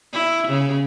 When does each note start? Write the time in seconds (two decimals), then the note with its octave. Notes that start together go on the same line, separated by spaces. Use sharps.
0.13 E4
0.48 C#3